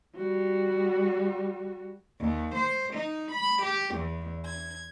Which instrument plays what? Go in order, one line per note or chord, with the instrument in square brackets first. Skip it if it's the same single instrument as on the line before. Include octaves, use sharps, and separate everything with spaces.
[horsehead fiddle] G3 F#4
[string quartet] D#2
C5
D#4
B5
G4
E2
G#6